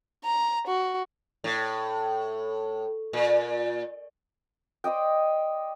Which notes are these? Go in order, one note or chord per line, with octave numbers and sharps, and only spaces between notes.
A#5
F#4
A2
A#2
C5 D5 D#5 G5